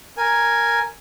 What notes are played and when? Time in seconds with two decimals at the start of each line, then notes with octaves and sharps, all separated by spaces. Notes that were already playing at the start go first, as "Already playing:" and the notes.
0.17 A#4 G#5